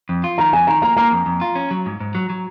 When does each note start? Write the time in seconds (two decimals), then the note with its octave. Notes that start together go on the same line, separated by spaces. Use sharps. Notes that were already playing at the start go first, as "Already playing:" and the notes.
0.09 F2
0.24 F4
0.38 D#3 A#5
0.53 F2 G#5
0.67 D#3 A#5
0.82 A#3 A#5
0.97 A#3 A#5
1.12 F2
1.26 F2
1.41 F4
1.56 C#4
1.71 F#3
1.86 G#2
2.00 G#2
2.15 F#3
2.30 F#3